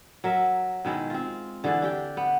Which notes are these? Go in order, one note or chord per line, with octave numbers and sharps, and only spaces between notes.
F#3 A#4 E5
B2 D#3 G#3 E4
C4 F4
D3 E3 G#4 D5
D4 G4 G5
B3